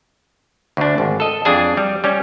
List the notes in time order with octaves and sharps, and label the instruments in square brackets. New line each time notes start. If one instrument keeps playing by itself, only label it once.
[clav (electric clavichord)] D2 D4
G#1
A4 D#5
F2 D4 G#4 G#5
G3
G3 C#4